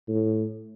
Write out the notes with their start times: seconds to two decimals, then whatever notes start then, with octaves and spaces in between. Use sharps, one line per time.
0.08 A2